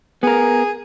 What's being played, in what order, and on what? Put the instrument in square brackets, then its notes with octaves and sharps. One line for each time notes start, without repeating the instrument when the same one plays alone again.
[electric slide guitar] B3 A#4 [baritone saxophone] G#4